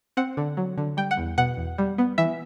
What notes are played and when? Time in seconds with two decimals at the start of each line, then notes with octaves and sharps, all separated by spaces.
0.17 C4 F#5
0.37 D3
0.57 F#3
0.78 D3
0.97 G3 G5
1.11 F#5
1.17 E2
1.38 B2 F#5
1.57 E2
1.78 G3
1.98 B3
2.18 E3 E5